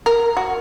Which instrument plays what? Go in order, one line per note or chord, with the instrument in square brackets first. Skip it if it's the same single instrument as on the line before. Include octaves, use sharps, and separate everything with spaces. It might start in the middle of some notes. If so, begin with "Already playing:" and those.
[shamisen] A#4
F#4